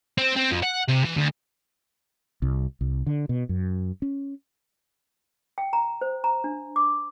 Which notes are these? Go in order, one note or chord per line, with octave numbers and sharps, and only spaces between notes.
C4
C4
F2
F#5
C3
E3
D2
C2
C2
D3
B2
F#2
C#4
G5
A#5
C5
A#5
D4
D6